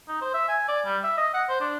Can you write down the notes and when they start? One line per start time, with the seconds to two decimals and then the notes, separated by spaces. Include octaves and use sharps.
0.09 D#4
0.22 C5
0.34 E5
0.49 G#5
0.68 D5
0.86 G3
1.04 E5
1.18 D#5
1.34 F#5
1.49 C5
1.61 D4